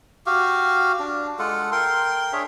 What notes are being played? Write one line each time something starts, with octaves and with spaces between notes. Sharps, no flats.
F#4 G4 F5
D4
G#3 F4 A4 F#5
A#4 G5 C6
D4 G#4 C#5 E5